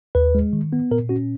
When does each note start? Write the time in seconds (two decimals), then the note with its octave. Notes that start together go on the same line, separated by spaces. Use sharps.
0.15 D#2 B4
0.35 G#3
0.53 D#3
0.73 B3
0.91 A#2 A#4
1.09 C#4 F#4